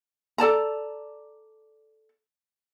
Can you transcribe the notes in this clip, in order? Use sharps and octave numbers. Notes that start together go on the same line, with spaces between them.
A4 D5 A5 A#5